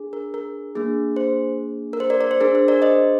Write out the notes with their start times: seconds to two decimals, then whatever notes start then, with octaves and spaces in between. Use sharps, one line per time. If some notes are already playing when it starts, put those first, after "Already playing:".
Already playing: D4 G#4
0.13 A#4
0.34 A#4
0.75 A#3 D4 G#4
1.16 C5
1.93 A#4
2.00 C5
2.10 A#4 D5
2.21 A#4 D5
2.31 C5
2.40 D4 G#4 A#4
2.55 C5
2.68 A#4 D5
2.82 C5 D#5